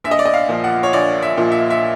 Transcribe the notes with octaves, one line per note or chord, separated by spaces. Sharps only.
A#1 E5
D#5
D5
D#5
F5
A#2 F3
F#5
C#5
A#1 D5
E5
A#2 F3
E5
E5